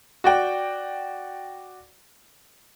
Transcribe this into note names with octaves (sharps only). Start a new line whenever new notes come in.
F#4 D5 G5